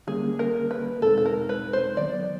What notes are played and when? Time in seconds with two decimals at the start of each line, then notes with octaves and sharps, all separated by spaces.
0.07 D3 G3 A#3 C#4 G#4
0.39 A#4
0.71 B4
1.02 E2 B2 G#3 C4 D#4 A4
1.18 A4
1.25 A#4
1.49 B4
1.73 C5
1.97 D#3 F#3 B3 D5